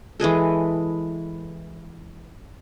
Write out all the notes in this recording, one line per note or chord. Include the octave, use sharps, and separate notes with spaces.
E3 G#3 G#4 A4